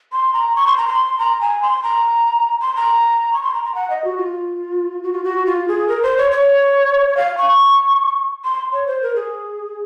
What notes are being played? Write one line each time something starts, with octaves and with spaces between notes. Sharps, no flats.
C6
A#5
C#6
C6
A#5
C6
A#5
G#5
C6
A#5
C6
A#5
C#6
C6
A#5
A#5
F#5
D#5
F#4
F4
F#4
F4
F#4
F4
G#4
A#4
C5
C#5
C#5
F5
C#6
C6
C#5
C5
A#4
G#4